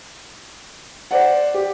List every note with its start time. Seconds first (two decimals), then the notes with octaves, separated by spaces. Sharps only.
1.11 C5 D5 F#5
1.54 G4